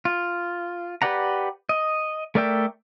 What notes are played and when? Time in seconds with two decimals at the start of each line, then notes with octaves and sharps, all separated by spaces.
0.05 F4
1.02 G4 B4 D5 F#5 A#5
1.69 D#5
2.35 A3 A#4 D5 E5 G5